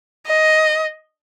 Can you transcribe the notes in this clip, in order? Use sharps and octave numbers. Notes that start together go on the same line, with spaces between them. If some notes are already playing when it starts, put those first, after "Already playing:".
D#5